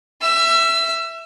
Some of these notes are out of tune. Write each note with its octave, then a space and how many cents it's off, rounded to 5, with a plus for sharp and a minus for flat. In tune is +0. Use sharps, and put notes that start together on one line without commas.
E5 +0 E6 +35